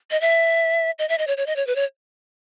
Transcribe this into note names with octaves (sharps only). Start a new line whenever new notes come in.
D#5
E5
D#5
E5
D#5
C#5
C#5
D#5
C#5
B4
C#5